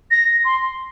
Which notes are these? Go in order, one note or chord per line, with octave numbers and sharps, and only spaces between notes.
A#6
C6